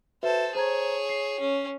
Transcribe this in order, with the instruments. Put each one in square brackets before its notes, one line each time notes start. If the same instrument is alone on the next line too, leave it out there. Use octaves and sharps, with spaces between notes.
[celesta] F#4 B4 E5 [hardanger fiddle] A4 C5
[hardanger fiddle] G#4 C#5 [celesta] C5 A#5 G#6
[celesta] C7
[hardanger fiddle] C#4